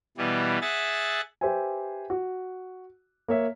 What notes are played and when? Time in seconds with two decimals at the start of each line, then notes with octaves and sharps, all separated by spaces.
0.17 B2 E3 G3 B3
0.61 G#4 E5 F#5 A6
1.41 G4 B4 C5 E5 G5 G#5
2.10 F#4
3.28 A#3 C#5 E5